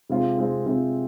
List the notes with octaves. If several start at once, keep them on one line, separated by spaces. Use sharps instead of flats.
C3 G#3 C4 F4
C3 G#3 C4 F4
C3 G#3 C4 F4